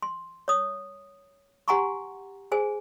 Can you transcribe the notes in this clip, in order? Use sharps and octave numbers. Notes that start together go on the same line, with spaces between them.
C6
C#5 D#6
G4 F#5 G#5 A#5 C6 C#6
G#4 C5 G#5